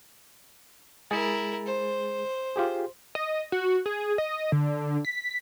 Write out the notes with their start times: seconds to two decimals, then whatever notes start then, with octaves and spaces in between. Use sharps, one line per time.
1.11 G#3 E4 G#4 A#4 A6
1.66 C5
2.56 F4 G4 G#4
3.15 D#5
3.52 F#4
3.86 G#4
4.18 D#5
4.52 D3
5.05 B6